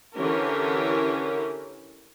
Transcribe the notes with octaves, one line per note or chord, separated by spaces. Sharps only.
D3 E3 C#4 G4 A#4